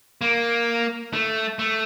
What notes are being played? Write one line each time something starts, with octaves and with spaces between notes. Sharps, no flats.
A#3
A3
A3